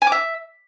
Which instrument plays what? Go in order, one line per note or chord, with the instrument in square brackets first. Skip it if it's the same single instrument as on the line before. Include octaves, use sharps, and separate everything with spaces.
[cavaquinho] G#5
D6
E5